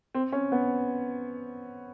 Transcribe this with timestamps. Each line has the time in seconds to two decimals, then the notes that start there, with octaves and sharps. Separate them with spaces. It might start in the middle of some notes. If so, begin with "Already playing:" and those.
0.14 C4
0.32 C#4
0.52 B3